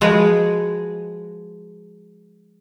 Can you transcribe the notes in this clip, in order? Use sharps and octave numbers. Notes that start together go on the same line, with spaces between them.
F3 G#3 F#4 G#4 B4